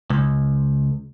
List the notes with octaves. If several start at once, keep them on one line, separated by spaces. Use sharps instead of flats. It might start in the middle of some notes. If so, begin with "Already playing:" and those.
C#2